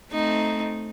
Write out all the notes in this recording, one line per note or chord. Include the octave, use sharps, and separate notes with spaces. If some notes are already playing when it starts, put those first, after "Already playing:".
A3 C4 D#4